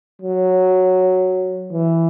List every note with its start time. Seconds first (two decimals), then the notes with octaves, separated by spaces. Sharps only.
0.22 F#3
1.72 E3